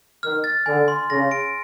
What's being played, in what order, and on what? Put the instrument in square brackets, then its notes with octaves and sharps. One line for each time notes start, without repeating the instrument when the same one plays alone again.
[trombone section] D#3 [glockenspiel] F6
[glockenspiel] A6
[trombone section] D3 [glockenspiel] G#5
[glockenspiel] C6
[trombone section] C#3 [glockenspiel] A#6
[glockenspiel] D7